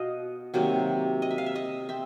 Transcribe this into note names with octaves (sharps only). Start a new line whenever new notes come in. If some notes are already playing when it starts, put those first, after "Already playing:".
Already playing: B2 D#5 F5
C3 D#3 F#3 A#3
D#5
E5
F5
E5
D#5
C4 E5